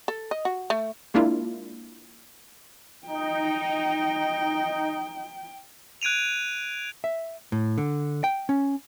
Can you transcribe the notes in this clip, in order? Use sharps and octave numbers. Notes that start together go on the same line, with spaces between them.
A4
D#5
F#4
A3
G#3 A#3 D4 E4 F4
D#4 G5
F#6 G#6 D7 D#7 F7
E5
A2
D3
G5
C#4